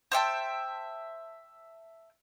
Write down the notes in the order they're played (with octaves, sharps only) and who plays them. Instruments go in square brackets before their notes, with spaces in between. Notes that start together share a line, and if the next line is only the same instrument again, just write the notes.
[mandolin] C5 E5 G5 A5